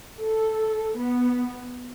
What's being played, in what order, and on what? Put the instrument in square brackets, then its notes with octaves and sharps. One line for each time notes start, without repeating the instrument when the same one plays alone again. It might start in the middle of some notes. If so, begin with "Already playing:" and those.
[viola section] A4
B3